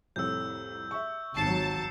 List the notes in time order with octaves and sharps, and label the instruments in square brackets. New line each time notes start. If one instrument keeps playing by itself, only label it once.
[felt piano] C2 F2 A2 [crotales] E6 G6
[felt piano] E5 C#6
[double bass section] G#1 F#3 [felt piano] D#2 [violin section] A5 [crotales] C7 C#7